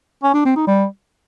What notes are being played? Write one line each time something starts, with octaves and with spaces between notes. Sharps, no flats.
C#4
D4
C4
D#4
G3